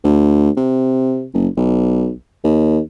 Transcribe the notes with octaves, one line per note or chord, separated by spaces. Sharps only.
D2
C3
F#1
B1
D#2